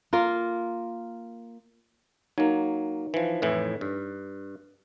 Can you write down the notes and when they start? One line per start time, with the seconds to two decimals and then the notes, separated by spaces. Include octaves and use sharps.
0.13 A#3 F4 A#4
2.38 F#3 A#3 D#4
3.14 E3 F3
3.42 F2 A2 E3
3.81 G2